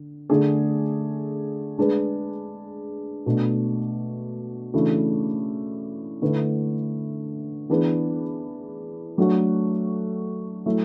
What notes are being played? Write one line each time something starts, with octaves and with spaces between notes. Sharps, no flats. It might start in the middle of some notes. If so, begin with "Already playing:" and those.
Already playing: D3
D3 A3 D4 G#4
G#3 D4 G#4 B4
B2 A3 D4
C#3 E3 A3 D4 F#4
D3 A3 E4 B4
E3 B3 D4 G#4 B4
F#3 A3 D4 F#4 A4
F#3 A3 E4